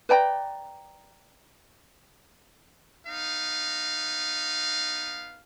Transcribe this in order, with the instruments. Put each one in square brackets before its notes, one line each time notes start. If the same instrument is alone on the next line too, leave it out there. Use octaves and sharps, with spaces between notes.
[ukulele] B4 D5 G5 A#5
[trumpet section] B3 D#4 F5